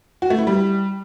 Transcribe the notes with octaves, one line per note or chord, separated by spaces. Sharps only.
F#4
A3
E4
G3